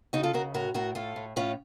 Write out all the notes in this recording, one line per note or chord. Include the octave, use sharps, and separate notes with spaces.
C#3 D#4 F#4
F4 A4
C#3 F#4 A#4
A2 F#4 A#4
A2 F#4 A#4
A2 F4 A4
A2
A2 C#4 F4